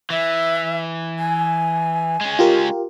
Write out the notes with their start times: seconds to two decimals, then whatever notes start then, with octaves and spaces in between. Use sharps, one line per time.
0.10 E3 E5
1.19 G#5
2.21 G#3 C#4
2.39 F4 G4 A#4